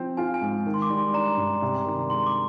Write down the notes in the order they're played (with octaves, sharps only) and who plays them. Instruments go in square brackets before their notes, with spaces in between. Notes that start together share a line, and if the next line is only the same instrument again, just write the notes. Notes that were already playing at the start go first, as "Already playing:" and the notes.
Already playing: [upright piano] F3 C4
[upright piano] F4 [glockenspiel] G#5
[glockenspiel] G#5
[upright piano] G#2
D#3
[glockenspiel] C6
D6
[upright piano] G3
[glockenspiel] C6
[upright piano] D4 [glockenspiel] A#5
[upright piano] G2
C3
D#3
[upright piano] G#3 [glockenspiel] C6
[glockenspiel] D6